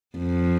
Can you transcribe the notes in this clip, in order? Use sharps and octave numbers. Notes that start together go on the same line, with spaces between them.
F2